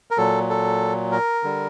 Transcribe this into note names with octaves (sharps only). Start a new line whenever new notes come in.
A#4
A#2 F#3 A4
A4
A#4
D3 G3